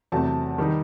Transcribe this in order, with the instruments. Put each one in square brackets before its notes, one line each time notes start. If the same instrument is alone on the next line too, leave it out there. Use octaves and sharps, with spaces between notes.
[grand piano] E2 C3 F#3 A3 A5
D#3 G3 D#4